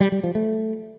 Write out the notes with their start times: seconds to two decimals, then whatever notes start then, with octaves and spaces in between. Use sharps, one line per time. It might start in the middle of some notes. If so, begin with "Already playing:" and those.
0.01 G3
0.12 G3
0.24 F3
0.35 A3